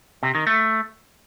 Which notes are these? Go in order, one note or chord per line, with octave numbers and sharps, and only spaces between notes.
C3
D#3
A3